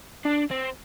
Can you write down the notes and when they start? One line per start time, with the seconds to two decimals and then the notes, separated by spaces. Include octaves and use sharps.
0.25 D4
0.51 C4